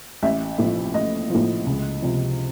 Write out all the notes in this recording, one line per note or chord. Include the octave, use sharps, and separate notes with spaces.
A1 E5
A2 F3
A1 D#5
A2 F3
C#2
C3 F3